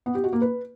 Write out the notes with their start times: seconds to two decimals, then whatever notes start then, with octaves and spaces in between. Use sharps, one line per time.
0.06 B3
0.15 G4
0.24 F#4
0.33 A#3
0.41 B4